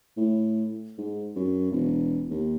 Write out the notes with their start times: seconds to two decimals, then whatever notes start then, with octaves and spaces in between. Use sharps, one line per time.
0.17 A2
0.98 G#2
1.36 F#2
1.71 E1
2.30 D#2